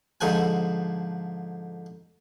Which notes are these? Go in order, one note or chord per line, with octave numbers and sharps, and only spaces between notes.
G#2 D3 F3 C5 F#5 G#5